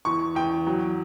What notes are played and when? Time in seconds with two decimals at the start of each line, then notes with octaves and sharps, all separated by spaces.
0.05 E2 C#6
0.35 E2 G5
0.67 F#3